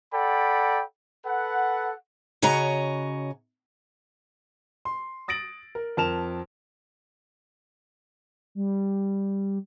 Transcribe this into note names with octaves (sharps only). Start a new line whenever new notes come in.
A4 D5 F#5 G5 B5
A4 B4 F#5
C#3 F#4 C#5 D#5 A#5
C6
D#6 A6 A#6 D7 F#7
A#4
F2 A#4 A5 F6 E7 F7
G3